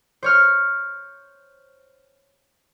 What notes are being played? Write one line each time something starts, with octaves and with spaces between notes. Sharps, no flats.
C5 C#5 F6